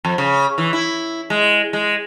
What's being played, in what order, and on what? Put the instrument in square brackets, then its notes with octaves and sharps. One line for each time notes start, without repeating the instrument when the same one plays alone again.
[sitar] F2
C#3
E3
E4
G#3
G#3